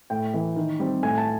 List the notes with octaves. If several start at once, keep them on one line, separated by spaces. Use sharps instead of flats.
A2 G5
E3 A3
D#3
G3 C4
A2 G#5
A5